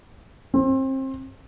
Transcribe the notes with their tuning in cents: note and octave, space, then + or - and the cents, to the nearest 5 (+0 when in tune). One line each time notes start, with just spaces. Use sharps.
C4 +30